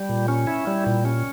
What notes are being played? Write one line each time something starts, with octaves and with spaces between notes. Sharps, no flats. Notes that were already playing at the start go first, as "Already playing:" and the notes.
Already playing: G3
A#2
C#4
E4
G3
A#2
C#4